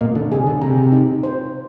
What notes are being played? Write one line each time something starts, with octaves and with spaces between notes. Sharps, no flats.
A#2 A#3 D#5
D3
C3 G#4
D3
C3 A#5
D#4
C5